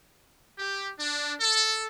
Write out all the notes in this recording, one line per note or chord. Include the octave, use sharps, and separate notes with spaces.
G4
D4
A4